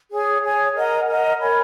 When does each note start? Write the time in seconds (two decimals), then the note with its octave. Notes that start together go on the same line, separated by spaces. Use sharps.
0.11 G#4 C#5 G#5
0.43 G#4 C#5 G#5
0.75 A#4 D#5 F#5 A#5
1.07 A#4 D#5 F#5 A#5
1.39 A#4 C#5 G#5 B5